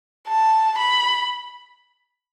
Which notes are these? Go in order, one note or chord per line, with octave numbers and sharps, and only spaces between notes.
A5
B5